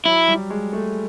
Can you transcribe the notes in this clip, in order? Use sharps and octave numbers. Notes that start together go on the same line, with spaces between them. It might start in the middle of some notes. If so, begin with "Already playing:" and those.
F#3 E4
G3
G#3
A3